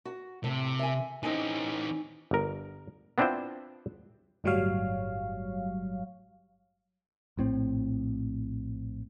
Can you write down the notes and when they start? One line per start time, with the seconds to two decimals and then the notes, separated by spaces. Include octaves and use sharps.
0.05 F#4
0.44 A2 C3
0.79 E5 G#5
1.23 E3 C4 C#4 D#4 G#5
2.31 G1 A#4
3.18 B3 C4 D4 E4 F4 C5
4.44 G1 A2 F#3 G3 C#5 F5
7.37 A#1 A2 C4